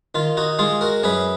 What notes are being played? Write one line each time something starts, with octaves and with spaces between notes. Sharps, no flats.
D#3 F4
D#4 F#4
G#3 F4 G#4
F#4 A#4
F#2 G#4 B4